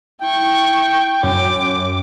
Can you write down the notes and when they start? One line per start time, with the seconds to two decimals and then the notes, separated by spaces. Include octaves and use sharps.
0.21 E4 G5 C#6
1.23 F#2 D6